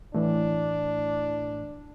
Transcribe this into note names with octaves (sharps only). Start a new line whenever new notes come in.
A2 E3 D4